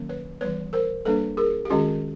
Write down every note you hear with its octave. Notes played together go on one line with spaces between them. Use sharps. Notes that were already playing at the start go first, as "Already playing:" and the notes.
Already playing: D#3 F#3 A#3 C#4
B4 C#5
E3 G3 B3 B4 C#5
A#4 C5
G3 A#3 D4 A4 B4
G#4 A#4
G4
D#3 G#3 C#4 F#4 G#4